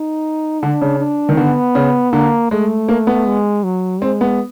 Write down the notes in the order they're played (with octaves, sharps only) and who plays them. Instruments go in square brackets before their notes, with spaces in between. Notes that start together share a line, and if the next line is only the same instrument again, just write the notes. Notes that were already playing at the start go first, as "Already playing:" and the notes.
Already playing: [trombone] D#4
[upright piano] D3 [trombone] D4
[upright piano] C#3
[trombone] D4
[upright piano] D#3
[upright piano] D3 [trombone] B3
[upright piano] C#3
[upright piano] D3 [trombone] A#3
[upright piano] G#3 [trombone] A3
[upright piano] A#3
B3
[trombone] G#3
F#3
[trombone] G#3 [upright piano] C4
[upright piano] B3